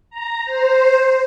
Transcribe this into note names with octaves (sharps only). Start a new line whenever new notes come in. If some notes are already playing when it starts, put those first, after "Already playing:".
A#5
C5